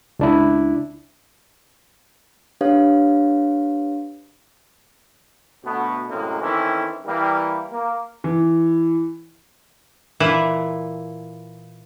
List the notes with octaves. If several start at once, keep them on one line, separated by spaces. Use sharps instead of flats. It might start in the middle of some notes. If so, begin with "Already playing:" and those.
C#2 D4 E4
D4 G4 B4 C#5 F5
D2 B2 A3 B3
F#2 A2 C3 G#3 A#3 C#4
D#3 E3 C4 C#4 E4 A4
E3 G3 A#3
A#3
E3
A#2 E3 E4